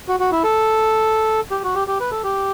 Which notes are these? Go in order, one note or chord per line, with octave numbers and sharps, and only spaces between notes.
F#4
F#4
E4
A4
G4
F#4
G4
G4
B4
A4
G4